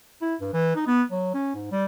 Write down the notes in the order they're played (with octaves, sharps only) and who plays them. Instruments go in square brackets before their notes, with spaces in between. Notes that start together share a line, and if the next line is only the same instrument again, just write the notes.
[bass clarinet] E4
G2
E3
D#4
B3
F#3
C#4
G#2
G3